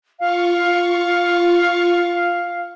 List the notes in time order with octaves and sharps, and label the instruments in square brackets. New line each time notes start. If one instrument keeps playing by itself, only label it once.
[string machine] F4 C#6 [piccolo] F5